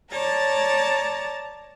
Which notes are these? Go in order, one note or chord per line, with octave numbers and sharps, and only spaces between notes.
C#5 D5 A5 A#5 A6